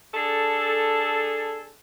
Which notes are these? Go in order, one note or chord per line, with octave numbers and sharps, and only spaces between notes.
D4 G#4 A4